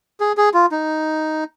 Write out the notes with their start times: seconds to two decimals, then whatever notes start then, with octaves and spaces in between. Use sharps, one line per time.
0.20 G#4
0.37 G#4
0.54 F4
0.72 D#4